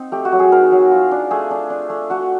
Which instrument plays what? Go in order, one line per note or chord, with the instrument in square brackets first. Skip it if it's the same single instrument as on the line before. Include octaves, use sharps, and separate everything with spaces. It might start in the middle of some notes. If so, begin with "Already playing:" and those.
Already playing: [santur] C4 D#4
A3 G4
F#4
F#3
G#4
D#4 A#4
F#3
F4
D4
A3 G#4
D4
D4
A3
A3 F#4